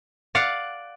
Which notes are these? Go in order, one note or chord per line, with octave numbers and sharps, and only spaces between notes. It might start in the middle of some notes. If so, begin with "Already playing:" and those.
D5 F5 F#5